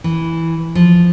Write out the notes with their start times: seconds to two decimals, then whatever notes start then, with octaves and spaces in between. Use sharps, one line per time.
0.04 E3
0.75 F3